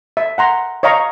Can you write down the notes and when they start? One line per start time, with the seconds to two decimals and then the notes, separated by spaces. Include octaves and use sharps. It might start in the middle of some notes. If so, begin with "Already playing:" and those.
0.17 E5
0.38 F#5 A#5 C6
0.83 C#5 D#5 F5 A#5 C#6